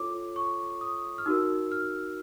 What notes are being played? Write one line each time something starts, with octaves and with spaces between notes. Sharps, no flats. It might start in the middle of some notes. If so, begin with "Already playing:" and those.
Already playing: F4 A4 C#5 D6
C#6
D#6
F6
D#4 F#4 A#4 E6
F6